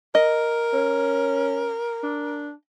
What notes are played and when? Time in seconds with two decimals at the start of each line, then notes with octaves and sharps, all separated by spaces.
0.15 A#4 D#5
0.73 C#4
2.03 D4